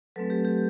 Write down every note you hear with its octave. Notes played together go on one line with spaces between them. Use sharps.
F#3 A3 C4 A4 B4
G4
G4